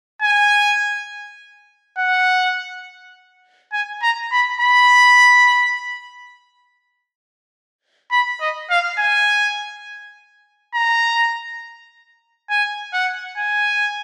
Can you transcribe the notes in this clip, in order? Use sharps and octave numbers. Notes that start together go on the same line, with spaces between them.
G#5
F#5
G#5
A#5
B5
B5
B5
D#5
F5
G#5
A#5
G#5
F#5
G#5